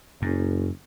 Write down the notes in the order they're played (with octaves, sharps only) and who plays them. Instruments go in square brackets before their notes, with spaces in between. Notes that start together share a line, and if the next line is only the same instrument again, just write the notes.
[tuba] F#1 [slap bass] F#2